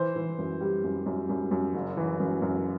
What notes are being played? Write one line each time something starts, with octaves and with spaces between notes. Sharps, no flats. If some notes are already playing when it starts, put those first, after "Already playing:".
Already playing: E3 C5
E3
F#2
G3
F#2
F#2
F#2
F#2
F#1
E3
F#2
F#2